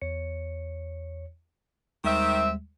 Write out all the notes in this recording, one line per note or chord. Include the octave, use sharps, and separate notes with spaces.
E2 C#5 C#7
D#2 D#3 G3 G#3 C4 E5